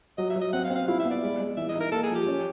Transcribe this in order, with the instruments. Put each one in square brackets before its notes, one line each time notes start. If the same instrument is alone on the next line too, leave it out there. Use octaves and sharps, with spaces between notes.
[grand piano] F#3 [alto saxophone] D#5
[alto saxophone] E5
[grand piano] F#3
[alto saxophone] D#5
[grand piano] C4 [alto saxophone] F#5
[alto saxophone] F5
[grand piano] C4
[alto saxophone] F5
[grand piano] E4 [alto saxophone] F5
[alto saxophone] E5
[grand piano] B3
[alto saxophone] D5
[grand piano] G#3
G#3
[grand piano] E3 [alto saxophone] E5
[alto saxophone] D#5
[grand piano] D#4
[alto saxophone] A#4
[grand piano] A#3 [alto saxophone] A4
[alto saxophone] G#4
[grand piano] F3
[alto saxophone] G4
[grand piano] C#4